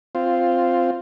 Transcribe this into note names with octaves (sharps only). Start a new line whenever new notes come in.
C4 F4